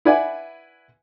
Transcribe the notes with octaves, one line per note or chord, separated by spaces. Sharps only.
E4 B4 D5 F#5 G#5